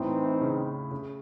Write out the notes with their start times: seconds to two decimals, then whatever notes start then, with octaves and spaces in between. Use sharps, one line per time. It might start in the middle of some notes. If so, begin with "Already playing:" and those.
Already playing: A2 E3 C4 D#4
0.41 C#3
0.91 C#3